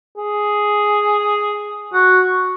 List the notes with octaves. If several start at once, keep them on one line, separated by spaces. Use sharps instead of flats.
G#4
F#4